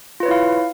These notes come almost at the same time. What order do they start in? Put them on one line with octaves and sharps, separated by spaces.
F4 B4 C#5 E4 F5